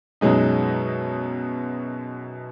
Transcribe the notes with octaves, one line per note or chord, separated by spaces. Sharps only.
F#2 B2 F#3 G#3 D#4